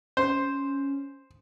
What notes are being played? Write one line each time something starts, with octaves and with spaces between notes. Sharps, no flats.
C#4 C5